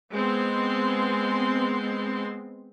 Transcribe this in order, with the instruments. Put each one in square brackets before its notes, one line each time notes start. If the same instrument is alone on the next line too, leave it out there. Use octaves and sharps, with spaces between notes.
[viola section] G#3 B3 C4 C6